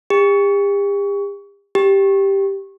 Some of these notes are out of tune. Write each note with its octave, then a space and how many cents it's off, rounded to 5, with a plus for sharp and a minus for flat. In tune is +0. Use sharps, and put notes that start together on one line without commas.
G4 +40
G4 +0